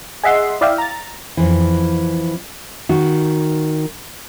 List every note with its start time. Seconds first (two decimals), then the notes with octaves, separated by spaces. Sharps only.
0.23 G#4 D#5 E5 F#5 C6
0.61 E4 D5 E5 F5 G5
0.78 A#5 A6
1.37 F2 E3
2.89 D#3 F#4